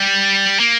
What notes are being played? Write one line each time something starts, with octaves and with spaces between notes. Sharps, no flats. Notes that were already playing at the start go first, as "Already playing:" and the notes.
Already playing: G3
A#3